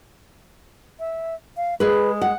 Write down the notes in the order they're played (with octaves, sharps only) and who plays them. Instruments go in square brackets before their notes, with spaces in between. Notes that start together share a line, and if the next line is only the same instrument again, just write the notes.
[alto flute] E5
F5
[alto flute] G#3 [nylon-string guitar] G#4 B4
[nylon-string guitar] F#5